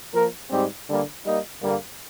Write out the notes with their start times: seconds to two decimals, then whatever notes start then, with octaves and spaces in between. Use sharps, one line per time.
0.14 F3 A#3 F4 A#4
0.50 G#2 G3 C4 G4
0.88 D3 G3 A#3
1.25 G3 A#3 D#4
1.62 G2 D3 G3 A#3